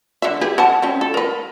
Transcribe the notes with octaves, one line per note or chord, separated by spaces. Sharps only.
D3 E5
G4 G#4 B4
A4 F#5 A5
C4 C#4
A4
A#4 B4